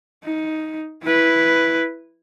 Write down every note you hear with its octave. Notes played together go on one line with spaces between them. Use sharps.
D#4
E4 B4